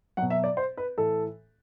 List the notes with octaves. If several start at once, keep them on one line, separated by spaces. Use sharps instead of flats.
B2 F#3 F#5
E5
D5
C5
B4
A2 E3 A4